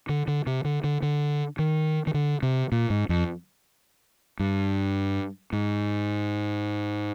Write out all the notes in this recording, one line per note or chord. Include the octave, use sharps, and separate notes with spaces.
D3
D3
C3
D3
D3
D3
D#3
D#3
D3
C3
A#2
G#2
F2
G2
G#2